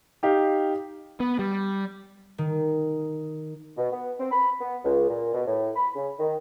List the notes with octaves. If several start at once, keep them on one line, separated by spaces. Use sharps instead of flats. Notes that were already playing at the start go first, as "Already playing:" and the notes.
D#4 G4 F5
B3
G3
D#3
B2
B3
C4
B5
B3
C#2
A#2
B2
A2
B5
C#3
D#3